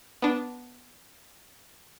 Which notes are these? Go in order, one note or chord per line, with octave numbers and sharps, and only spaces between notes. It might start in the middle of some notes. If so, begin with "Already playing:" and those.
B3 D4